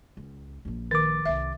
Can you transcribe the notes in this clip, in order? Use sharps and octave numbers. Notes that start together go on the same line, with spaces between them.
C#2
A#1 F3
D#3 A#4 D6 A6
D#1 C2 E5